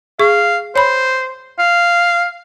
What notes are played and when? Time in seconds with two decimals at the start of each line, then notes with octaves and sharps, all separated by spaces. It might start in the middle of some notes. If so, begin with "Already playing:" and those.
0.19 G#4 F5 C#6
0.76 C5 C#5 B5
1.59 F5